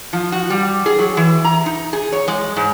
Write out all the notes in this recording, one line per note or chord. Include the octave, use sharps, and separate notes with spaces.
F3
F#4
G3
G#4
F#3
E3
A#5
D#4
G#4
C#5
G#3
G#2